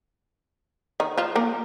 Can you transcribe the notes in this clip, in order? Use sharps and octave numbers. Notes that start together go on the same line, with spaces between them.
D#3 D#4
F3 F4
A#3 A#4